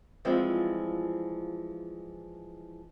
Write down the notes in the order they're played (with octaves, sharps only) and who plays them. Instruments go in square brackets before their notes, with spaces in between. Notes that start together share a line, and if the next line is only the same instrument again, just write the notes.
[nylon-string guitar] E3 F3 G3 G#3 C4 F4